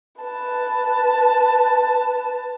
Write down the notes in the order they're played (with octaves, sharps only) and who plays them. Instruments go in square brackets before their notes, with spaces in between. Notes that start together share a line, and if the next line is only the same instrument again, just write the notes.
[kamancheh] B4 A5